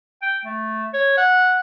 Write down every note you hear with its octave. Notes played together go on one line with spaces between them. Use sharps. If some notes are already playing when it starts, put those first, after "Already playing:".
G5
A3
C#5
F#5